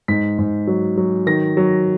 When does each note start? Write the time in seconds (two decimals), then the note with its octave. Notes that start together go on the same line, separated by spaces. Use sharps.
0.08 G#2 B6
0.39 G#2
0.67 F#3
0.97 F#3
1.26 D#3 A#6
1.57 F#3